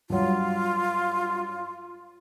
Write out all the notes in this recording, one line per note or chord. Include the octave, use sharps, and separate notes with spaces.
G2 F#3 F4